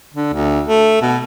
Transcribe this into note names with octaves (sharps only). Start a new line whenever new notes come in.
D3
D2
A3
B2